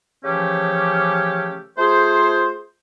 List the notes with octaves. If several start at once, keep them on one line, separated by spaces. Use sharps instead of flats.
C#3 E3 F3 A3 C#4 G4
A3 F4 G#4 C5